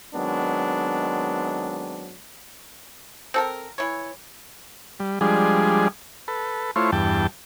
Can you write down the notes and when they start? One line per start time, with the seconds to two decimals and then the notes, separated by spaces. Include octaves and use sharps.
0.14 D#3 F#3 G#3 B3 C4 D4
3.34 C4 A4 A#4
3.78 E3 C#5
5.00 G3
5.21 F3 G3 G#3 D4 G#4
6.28 A4 B4
6.76 A3 E4 F4 C5 C#5
6.92 E2 G2 G5 A5